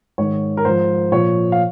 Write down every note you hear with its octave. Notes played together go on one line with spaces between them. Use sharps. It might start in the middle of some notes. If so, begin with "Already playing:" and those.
G#2 D#3 C#5
A#4
G#2 F3 C5
A#2 F3 C#5
F5